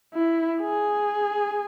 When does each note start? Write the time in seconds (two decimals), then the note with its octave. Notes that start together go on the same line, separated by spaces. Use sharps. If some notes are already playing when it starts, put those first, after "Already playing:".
0.14 E4
0.61 G#4